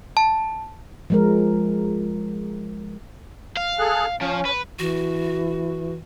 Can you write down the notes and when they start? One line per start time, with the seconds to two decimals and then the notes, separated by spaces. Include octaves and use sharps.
0.17 A5
1.10 F3 G#3 A#4
3.57 F5
3.79 G#4 A4 F#6
4.21 F3 C#4
4.45 B4
4.79 E3 F#4